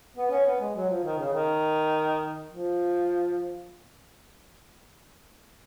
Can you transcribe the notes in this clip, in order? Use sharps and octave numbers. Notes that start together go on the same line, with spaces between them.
B3
C#4
B3
G#3
F#3
F3
D#3
C#3
D#3
F3